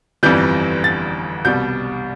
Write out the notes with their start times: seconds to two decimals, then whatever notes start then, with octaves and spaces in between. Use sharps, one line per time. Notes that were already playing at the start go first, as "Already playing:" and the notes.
0.23 G1 F2 E3 G3 G6
0.84 A6
1.45 C2 B2 G3 G6